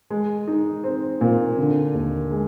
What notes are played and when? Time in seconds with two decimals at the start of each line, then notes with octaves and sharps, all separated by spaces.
0.10 G#3
0.47 D#4
0.84 C4
1.21 A#2
1.58 D3
1.94 D#2
2.31 G#3